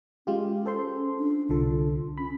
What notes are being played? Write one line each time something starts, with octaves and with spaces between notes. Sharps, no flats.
G#3 C#4 F4 G4
A4 C5 C6
D4
C2 D3 F4 A4
C#4 B5